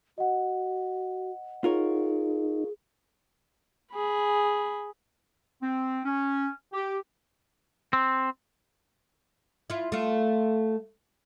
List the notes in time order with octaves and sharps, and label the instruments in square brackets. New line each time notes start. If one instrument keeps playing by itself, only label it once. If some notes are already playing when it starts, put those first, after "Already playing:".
[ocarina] F#4 [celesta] D#5 F#5
[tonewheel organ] D#4 [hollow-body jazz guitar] F4 A#4 C#5 [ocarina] G#4
[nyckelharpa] G#4 B5
[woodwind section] C4
C#4
G4
[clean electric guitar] C4
[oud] E4 F4
A3 F4